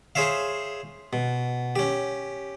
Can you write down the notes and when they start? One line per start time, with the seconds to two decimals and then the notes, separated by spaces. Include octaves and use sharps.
0.15 G#4 C5 C#5 E5 F5
1.13 B2
1.76 C#4 G4